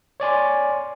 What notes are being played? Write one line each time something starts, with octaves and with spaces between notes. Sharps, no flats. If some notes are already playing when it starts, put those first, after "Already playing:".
C#5 D5 G#5 C6